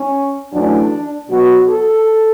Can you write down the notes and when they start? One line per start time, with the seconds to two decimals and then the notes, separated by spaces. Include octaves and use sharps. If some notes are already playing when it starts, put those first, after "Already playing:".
Already playing: C#4
0.53 F#2 E3 A3 D4
1.30 B2 F#3 B3 F#4
1.69 A4